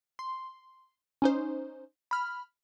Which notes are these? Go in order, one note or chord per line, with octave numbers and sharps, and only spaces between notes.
C6
C#4 D#4 C5
B5 F6